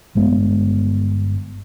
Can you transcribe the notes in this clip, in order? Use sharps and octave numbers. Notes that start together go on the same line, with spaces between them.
G1 G2 G#3 B3